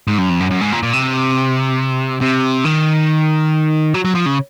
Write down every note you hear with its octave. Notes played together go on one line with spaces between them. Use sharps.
G#2
F#2
F2
F#2
F#2
G#2
A#2
A#2
C3
C3
D#3
F#3
F#3
F3
C#3